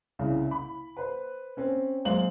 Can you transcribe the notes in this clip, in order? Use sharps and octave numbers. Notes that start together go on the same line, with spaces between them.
C2 C#3
B5
B4 C5
C4 C#4
F#2 G#3 C5 F5 F#7